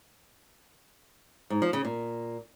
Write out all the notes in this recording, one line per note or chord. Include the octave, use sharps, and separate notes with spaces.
G#2
F3
C#3
A#2